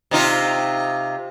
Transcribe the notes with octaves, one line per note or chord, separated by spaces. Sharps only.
C3 D#4 F4